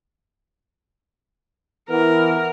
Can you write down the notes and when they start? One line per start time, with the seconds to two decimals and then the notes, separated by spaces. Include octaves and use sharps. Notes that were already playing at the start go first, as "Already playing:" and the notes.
1.89 E3 B3 A#4